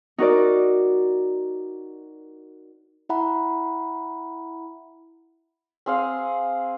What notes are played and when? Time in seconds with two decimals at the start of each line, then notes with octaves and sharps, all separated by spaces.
0.18 D#4 F#4 A#4 D5
3.09 E4 E5 F#5 A#5 B5
5.86 C4 G#4 F5 F#5